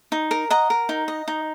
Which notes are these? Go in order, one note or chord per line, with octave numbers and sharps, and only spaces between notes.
D#4
A#4
D#5 F#5 A#5
A#4
D#4
D#5
D#4